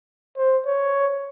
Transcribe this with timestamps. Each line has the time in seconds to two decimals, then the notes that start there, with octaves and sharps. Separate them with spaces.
0.37 C5
0.66 C#5